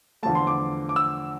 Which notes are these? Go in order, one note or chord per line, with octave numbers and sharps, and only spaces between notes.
E2 D3 F3 A3 A5
C6
D6
D6
E6